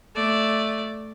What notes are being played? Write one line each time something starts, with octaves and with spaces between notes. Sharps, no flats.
A3 D5